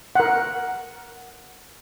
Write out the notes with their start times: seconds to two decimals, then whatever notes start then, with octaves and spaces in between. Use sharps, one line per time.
0.15 A#4 F#5